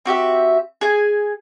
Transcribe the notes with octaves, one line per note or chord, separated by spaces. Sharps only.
C4 F#4 G4 E5
G#4 G#5